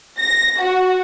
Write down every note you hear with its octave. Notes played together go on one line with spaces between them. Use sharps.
A#6
F#4